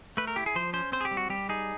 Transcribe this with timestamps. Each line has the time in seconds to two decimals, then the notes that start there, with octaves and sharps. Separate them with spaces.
0.17 A3 B4
0.27 A#4
0.36 E4 G4
0.46 G#4
0.55 F3 C5
0.73 C#4 C5
0.92 C4 C5
1.01 G#4
1.05 G4
1.11 G3
1.17 F#4
1.30 G3 G4
1.49 D#4 G#4